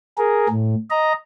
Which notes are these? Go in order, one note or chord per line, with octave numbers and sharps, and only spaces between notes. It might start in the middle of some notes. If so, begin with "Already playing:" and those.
G#4 A#4
A2
D#5 A#5